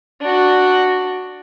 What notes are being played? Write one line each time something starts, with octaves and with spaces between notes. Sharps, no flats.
D4 F#4